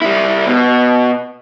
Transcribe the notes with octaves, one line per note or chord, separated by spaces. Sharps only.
G3 E4
B2